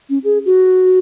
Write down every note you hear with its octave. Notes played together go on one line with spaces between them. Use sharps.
C#4
G#4
F#4